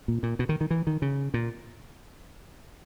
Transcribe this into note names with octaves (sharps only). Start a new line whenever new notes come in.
A#2
A#2
B2
D#3
D#3
E3
D#3
C#3
A#2